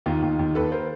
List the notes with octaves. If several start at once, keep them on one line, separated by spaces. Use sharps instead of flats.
D#2 D#4 F4
D#2
D#2
D#2 A4 B4
A#4 C5